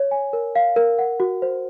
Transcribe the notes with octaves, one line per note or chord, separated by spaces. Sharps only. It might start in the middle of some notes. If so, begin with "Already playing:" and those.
Already playing: C#5
G#5
A#4
F5
A#4
F#5
F#4
C5